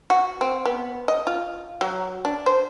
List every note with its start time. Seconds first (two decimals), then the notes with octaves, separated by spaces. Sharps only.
0.10 F#4
0.41 C4
0.65 B3
1.08 D#5
1.27 F4
1.81 F#3
2.25 D4
2.46 C5